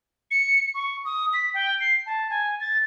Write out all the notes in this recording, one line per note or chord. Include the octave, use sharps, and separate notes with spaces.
C#7
C#6
D#6
B6
G5
C7
A5
G#5
A6